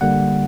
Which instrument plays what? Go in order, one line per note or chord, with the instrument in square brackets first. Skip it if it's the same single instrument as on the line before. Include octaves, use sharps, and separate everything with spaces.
[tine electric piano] D3 G3 A#3 F#5